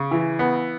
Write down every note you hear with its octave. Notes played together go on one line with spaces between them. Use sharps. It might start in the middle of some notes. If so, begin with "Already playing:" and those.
Already playing: C#3
E3
B3